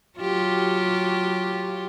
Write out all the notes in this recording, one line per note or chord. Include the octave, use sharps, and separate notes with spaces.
F#3 F4 G4